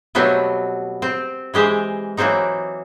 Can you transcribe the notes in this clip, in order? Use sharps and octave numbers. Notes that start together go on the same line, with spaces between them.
B2 F#3 G3 A3 B3 C4
C4
E3 G#3 G4 C5
E3 F#3 A#3 C4 D#4